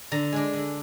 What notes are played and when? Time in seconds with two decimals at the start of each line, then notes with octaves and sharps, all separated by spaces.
0.12 D3 A#5
0.33 G#3 D4
0.53 D3